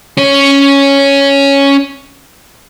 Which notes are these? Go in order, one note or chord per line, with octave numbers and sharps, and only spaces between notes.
C#4 C#5